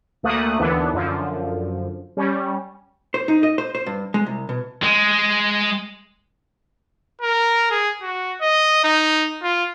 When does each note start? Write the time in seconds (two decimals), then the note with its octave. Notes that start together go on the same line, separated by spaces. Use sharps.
0.23 D2 A3 A#3 D#6 F#6
0.59 D#2 D3 E3 B3 D4
0.94 F#2 D3 F3
2.17 G3 C#4
3.14 C5
3.28 D#4
3.43 D#5
3.58 C5
3.75 C5
3.86 G2
4.14 G#3
4.26 C2
4.49 B2
4.83 G#3
7.21 A#4
7.71 G#4
8.02 F#4
8.41 D#5
8.84 D#4
9.43 F4